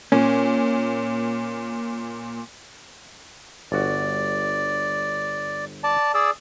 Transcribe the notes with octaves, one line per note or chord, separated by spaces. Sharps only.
A#2 C#4
G1 F#4 D5
D5 A5
G#4 D5 E6